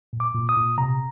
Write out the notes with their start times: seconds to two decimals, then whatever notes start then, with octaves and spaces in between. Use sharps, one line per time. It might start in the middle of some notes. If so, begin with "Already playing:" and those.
0.13 A#2
0.20 D6
0.34 A#2
0.49 D#6
0.57 A#2
0.78 C3 A#5